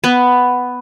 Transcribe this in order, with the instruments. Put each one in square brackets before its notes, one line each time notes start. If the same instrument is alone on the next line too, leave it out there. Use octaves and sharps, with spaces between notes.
[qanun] B3